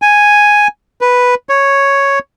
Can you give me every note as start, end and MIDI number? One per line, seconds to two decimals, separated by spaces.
0.02 0.68 80
1.01 1.35 71
1.49 2.19 73